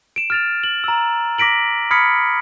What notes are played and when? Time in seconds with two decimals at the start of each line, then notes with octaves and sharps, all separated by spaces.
0.16 D7 E7
0.30 F6 A6 F7
0.64 F#7
0.84 A#5 E6
1.38 D6 A#6 B6 D7 F#7
1.91 B5 D#6 F6 G#6 B6 C#7